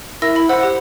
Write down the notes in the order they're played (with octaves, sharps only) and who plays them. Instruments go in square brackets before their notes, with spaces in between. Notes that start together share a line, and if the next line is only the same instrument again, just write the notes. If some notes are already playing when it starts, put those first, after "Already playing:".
[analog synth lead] E4 [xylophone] A#4 E6 A#6
[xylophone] E5 B5
[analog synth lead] C5 [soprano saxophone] F#5 [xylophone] E6
[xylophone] G4